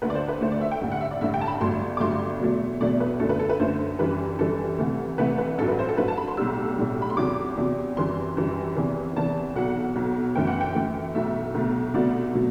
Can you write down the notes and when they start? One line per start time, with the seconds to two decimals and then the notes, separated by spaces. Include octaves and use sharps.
0.02 D2 D3 A3 B4
0.10 D5
0.15 C5
0.28 B4
0.41 D2 D3 A3 C5
0.52 D5
0.61 E5
0.72 G5
0.81 A1 G2 D3 A3
0.91 F#5
1.01 E5
1.11 D5
1.21 A1 G2 D3 A3 E5
1.34 G5
1.41 A5
1.47 B5
1.61 G1 G2 F#3 A3 C6
1.97 D6
2.00 G1 G2 F#3 A3 C6
2.40 E2 B2 F#3 A3
2.81 E2 B2 F#3 A3 D5
3.00 B4
3.20 F#2 D3 A3 A4
3.29 B4
3.39 A4
3.50 B4
3.60 F#2 D3 A3 C5
3.99 F#2 E3 G3 B4
4.39 F#2 E3 G3 A4
4.78 C2 C3 E3 A3
5.18 C2 C3 E3 A3 B4
5.38 B4
5.58 A1 G2 F#3 A4
5.68 B4
5.79 C5
5.89 A4
5.98 A1 G2 F#3 B4
6.08 A5
6.18 B5
6.28 C6
6.37 B1 A2 G3 E6
6.78 B1 A2 G3
7.02 B5
7.10 C6
7.17 E2 C3 F#3 D6
7.57 E2 C3 F#3
7.96 F#2 E3 G3 C6
8.37 F#2 E3 G3
8.77 E2 C3 E3
9.16 E2 C3 E3 A5
9.56 B1 B2 F#3 F#5
9.96 B1 B2 F#3
10.35 F#2 E3 A3 G5
10.47 F#5
10.61 G5
10.75 F#2 E3 A3
11.15 B1 B2 A3 E5
11.54 B1 B2 A3
11.94 C2 B2 F#3 A3 D5
12.34 B2 F#3 A3